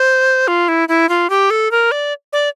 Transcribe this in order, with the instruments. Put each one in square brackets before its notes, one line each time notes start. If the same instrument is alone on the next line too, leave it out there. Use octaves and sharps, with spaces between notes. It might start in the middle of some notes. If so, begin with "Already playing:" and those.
Already playing: [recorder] C5
F4
E4
E4
F4
G4
A4
A#4
D5
D5